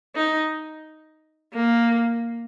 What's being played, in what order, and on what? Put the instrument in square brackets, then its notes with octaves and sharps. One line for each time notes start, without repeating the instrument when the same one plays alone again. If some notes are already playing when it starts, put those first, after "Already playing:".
[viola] D#4
A#3